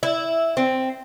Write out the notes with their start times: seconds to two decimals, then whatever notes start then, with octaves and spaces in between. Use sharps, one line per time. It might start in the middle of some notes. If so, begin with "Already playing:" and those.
0.03 E4
0.57 C4